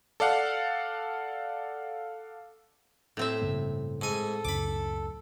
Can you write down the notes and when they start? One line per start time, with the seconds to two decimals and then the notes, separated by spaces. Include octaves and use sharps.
0.20 A4 D5 F5 F#5
3.17 A2 C4 E5
3.42 G2 C#3 A#3
4.02 G#2 A4 G#5
4.45 C#2 F#2 C#3 B5 D6